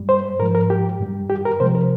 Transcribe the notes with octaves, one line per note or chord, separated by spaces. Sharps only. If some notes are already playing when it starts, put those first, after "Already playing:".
Already playing: G2 G3
C5
G#2 F3 G#3 A#4
A#4
G4
G2 G3
G4
A#4
C3 F3 G#3 C5
A#4